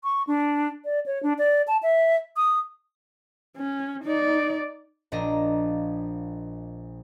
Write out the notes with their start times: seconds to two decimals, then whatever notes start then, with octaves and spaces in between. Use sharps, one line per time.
0.04 C#6
0.27 D4
0.85 D5
1.06 C#5
1.23 D4
1.38 D5
1.68 A5
1.83 E5
2.37 D#6
3.57 C#4
4.04 D#4 D5
5.12 A#1 A#2 D4 D#5